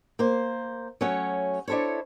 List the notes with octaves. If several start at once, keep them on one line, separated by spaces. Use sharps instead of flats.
A#3 C5
F#3 A3 C#4 C#5
D4 E4 A4 C5 C#5